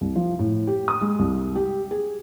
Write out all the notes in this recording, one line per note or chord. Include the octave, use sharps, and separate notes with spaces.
C2
F3
A2
G4
D#6
G#3
C2
G4
G#4